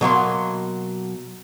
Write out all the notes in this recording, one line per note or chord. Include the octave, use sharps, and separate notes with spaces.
B2 F#3 A#3 C6